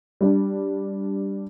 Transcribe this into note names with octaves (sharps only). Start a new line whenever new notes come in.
G3 D4